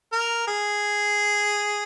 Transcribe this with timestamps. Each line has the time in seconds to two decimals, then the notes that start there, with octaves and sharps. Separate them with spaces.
0.12 A#4
0.48 G#4